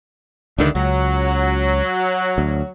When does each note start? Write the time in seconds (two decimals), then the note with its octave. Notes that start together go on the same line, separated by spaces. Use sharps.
0.58 C#2 G2 D3 D#3 A3 D4
0.75 C#2 F#3
2.38 D2